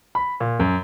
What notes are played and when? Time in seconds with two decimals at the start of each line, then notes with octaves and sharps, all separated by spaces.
0.15 B5
0.40 A#2
0.59 F#2